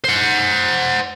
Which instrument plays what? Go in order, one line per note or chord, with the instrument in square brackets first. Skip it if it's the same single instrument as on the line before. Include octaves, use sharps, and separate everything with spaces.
[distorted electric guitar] C5 F#5